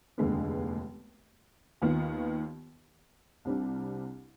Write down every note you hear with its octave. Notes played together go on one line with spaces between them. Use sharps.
F1 D#2 D3 G#3 B3
D#2 D#3 B3 F4
C2 C3 G3 D4